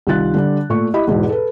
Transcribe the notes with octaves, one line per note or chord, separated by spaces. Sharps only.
C2 D#3 F4 F#6 A6
D3 G3 D4
A#2 A3 C#6
E4 G4 D#5 B5
E2 G#2 B2 E3
A4 B4